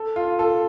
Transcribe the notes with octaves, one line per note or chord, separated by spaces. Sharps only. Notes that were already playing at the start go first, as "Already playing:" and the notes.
Already playing: A4
F4
A4